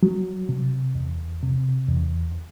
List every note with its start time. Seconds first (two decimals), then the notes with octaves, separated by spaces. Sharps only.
0.03 F#3
0.49 C3
0.95 E2
1.42 C3
1.89 E2